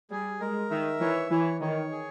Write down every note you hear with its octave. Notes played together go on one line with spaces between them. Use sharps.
G3 G#4
G#3 A#4
D#3 E5
E3 C#5
E3 C#5
D#3 C#5
G#4